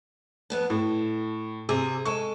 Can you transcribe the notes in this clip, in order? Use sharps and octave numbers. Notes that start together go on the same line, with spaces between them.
F2 B3 D4
A2 A4
C3 G#4
G#3 A4 C#6